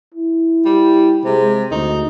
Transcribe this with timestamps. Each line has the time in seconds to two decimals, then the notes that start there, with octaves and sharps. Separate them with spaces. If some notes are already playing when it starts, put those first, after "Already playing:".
0.14 E4
0.65 G3
1.24 C3 G#3
1.71 D2 D#4